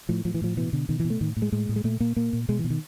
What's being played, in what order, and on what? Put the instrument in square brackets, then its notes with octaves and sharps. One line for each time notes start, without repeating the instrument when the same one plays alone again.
[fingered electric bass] A2 F3
A2 F3
E3
A2 F3
B2 E3
B2 D3
B2 D#3
E3
B2
A3
A2 D#3
A2
G#3
A2 G#3
A2
G#3
A#2 A3
A#2 A#3
A#2 A#3
A#2
B2 G#3
E3
B2
D#3